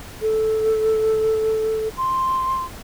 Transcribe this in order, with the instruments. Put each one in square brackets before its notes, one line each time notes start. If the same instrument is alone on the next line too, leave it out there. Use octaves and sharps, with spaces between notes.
[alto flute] A4
C6